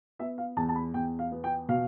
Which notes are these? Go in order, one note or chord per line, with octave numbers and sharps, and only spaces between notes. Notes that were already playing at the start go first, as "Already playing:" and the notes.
B3 E5
F5
E2 A5
A5
B5
E2 G5
F5
B3
G5
B2 F5